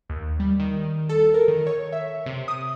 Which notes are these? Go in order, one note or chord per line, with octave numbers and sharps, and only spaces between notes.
D#2
G3
D#3
A4
A#4
D#3
C#5
E5
C3
D#6